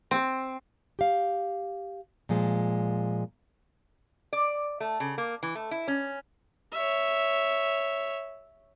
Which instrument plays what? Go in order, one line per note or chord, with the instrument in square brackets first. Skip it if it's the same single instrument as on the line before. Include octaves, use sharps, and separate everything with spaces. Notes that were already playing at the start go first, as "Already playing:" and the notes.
[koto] C4
[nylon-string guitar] G4 F5
A#2 F3 G#3
[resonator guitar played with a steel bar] D5
A3
C#3
A#3
E3
A3
E4
C#4
[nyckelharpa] C#5 E5